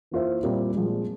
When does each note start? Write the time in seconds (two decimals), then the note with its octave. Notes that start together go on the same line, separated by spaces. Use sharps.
0.11 E3 A#3 F4 C5 E5
0.43 A#2 G3 C4 F4 A#4
0.75 A#2 F3 G#3